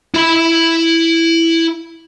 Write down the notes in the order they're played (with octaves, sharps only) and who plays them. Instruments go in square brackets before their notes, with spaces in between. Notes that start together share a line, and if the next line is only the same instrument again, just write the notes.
[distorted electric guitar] E4 B5